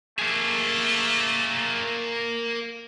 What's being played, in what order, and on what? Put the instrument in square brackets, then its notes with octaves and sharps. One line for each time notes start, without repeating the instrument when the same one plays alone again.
[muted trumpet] A3 [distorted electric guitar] A#3 G#4